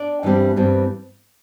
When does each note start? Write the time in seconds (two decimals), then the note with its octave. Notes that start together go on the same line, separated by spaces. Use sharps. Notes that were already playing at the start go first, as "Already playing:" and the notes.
Already playing: D4 D5
0.23 G2 E3 G3 C4
0.56 G2 E3 G3 C4